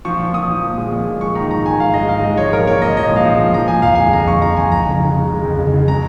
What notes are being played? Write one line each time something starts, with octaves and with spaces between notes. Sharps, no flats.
F3 C#6
A#2
A#2 D#6
F3
A#2
G#3
A#2
F3
G#3 C#6
D#3 A#5
G#2 A#5
D#3 G#5
G#2 F5
G#3 D#5
G#2 F5
G#3 D#5
F3 C#5
A#2 A#4
A#2 C#5
A#2 D#5
F3 D#5
G#3
F5
F3
A#2
F3 A#5
F3 G#5
F2 F5
G#3 G#5
F2 A#5
F3 C#6
F3 A#5
F2 G#5
F2 A#5
C#3
C#3
G#3
G#3
F2
C#3
C#3
G#3 A#5